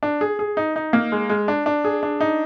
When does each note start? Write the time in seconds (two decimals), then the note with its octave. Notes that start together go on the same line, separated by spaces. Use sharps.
0.03 D4
0.21 G#4
0.39 G#4
0.57 D#4
0.76 D#4
0.93 A#3
1.12 G#3
1.29 G#3
1.48 D4
1.66 D4
1.84 G#4
2.03 D4
2.21 D#4